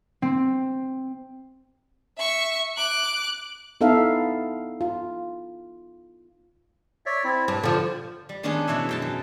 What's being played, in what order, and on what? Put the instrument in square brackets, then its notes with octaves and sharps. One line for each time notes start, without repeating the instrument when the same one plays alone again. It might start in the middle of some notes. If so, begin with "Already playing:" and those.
[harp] C4
[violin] E5 C#6
D6 F#6
[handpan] B3 D#4 E4 A4 E5 F5
F4
[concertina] C#5 D5 E5
C4 E4
[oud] G2 [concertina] A5
[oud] D3 F3
[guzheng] G3
D#3 G#3 B3 C#4 D4 G#4
B2 E3 C#5 E5
F#2 G5 A5
F#2